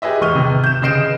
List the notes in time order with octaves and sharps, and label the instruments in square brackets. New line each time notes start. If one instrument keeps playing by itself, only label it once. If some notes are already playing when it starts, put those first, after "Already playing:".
[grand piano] G4 G#4 B4 D#5 E5
E1 B4 C#6 F6 D#7 G7
C3
G6 E7
C#3 B4 D#5 C7 D7 E7